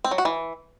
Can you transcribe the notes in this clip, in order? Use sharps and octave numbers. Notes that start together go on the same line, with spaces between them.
C4
F#3
F#4
E3